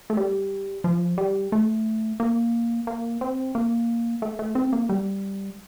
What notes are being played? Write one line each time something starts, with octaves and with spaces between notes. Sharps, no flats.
A3
G3
F3
G3
A3
A#3
A#3
C4
A#3
A3
A3
C4
A#3
G3